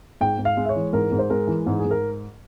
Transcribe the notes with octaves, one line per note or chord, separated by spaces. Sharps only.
G#2 G5
G#2
F5
G#3
E5
C#5
E3
G#2 A#4
G#2
C5
G#3 A#4
E3
G#2 G#4
G#4
G#2
A#4